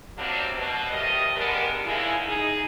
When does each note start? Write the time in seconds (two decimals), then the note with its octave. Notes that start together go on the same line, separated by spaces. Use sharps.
0.18 C3 F#3 G3 A#3 C4 D4
0.57 B2
0.91 F2 G3 A3 A#4 D#5
1.36 D3 G3 G#3 B3 D4 A#4
1.85 E2 C#3 G#3 D#4 E4
2.26 D#4 G#4